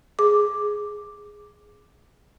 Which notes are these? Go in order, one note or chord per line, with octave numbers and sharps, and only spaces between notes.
G#4 D6